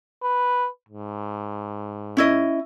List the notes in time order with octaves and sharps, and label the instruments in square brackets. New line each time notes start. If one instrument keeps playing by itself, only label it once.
[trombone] B4
G#2
[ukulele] C#4 E4 D#5